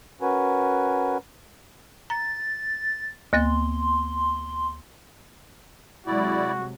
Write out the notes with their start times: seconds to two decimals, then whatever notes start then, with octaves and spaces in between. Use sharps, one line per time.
0.22 C#4 F#4 A#4 B4 G#5
2.10 A#5 A6
3.33 D2 A#3 C6 A6
6.07 C3 F#3 G#3 E4 F#4 D5